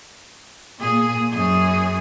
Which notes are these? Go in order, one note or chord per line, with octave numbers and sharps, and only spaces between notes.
A#2 G#4
F#2 G#4